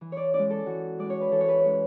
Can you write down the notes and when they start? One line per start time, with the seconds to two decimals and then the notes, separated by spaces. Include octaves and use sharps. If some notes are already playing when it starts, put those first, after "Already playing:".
0.01 E3
0.12 C#5 D5
0.34 G#3 C#4 E4 D5
0.50 A4
0.66 E3 F#4
0.99 G#3 C#4 E4 D5
1.10 C#5
1.21 B4
1.31 E3 A4
1.40 C#5
1.48 B4
1.64 G#3 C#4 E4 C#5